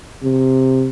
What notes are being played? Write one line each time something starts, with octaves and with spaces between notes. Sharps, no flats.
C3